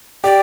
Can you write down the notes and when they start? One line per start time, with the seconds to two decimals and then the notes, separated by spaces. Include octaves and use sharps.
0.24 G4 D5